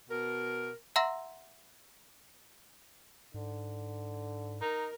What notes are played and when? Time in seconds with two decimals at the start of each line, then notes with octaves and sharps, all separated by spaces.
0.08 B2 A#4
0.96 E5 F#5 A#5 C6 E6 A#6
3.34 G#2 D3
4.61 D#4 A#4